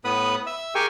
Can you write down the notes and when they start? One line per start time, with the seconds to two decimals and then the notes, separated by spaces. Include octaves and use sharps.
0.05 A2 B3 B4 B5 D#6
0.46 E5 E6
0.75 G4 G#4 A#4 G5 G#5 C#6